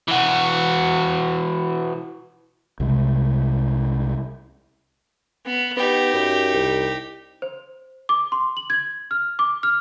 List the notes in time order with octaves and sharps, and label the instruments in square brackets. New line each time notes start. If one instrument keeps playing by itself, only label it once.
[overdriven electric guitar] E3 F#4
[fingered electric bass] C2 C3 G#3
[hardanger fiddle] B3
[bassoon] B3 [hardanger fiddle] D#4 G4
[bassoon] F#2
C2
[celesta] C5
D6
C6
F#7
G#6
F6
D6
F6